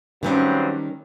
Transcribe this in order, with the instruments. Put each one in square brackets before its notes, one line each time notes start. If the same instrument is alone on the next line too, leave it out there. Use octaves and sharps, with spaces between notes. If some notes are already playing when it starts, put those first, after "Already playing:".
[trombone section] G2 F#3 C4 [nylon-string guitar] D#3 G3 C#4